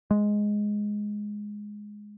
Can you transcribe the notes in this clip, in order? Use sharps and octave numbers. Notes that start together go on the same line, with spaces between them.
G#3